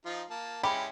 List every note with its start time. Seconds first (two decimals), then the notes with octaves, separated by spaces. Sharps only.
0.05 F3 D#4 F4
0.30 A#3 A5
0.63 G#3 C#4 E4 G4 B5